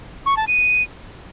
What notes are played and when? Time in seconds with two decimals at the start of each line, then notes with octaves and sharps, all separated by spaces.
0.26 C#6
0.37 A5
0.47 D#7